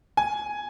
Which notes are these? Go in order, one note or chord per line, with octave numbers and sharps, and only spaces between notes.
G#5